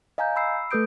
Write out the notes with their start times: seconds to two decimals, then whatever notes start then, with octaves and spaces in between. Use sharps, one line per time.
0.18 D#5 F5 G#5 A#5 G6
0.36 B5 E6 C7
0.71 A3 A4 B4 D#6 G6 D7